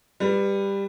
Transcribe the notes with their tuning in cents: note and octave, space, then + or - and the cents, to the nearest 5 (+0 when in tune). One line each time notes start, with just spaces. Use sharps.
G3 +15 B4 +0